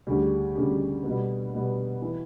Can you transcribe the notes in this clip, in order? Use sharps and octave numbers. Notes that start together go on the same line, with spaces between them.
D2 C#3 G3 C#4 G4
D2 C#3 G3 C#4 G4
B2 G3 B3
B2 G3 B3
E3